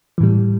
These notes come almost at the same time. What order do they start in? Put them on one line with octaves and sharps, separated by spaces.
E3 A2 G3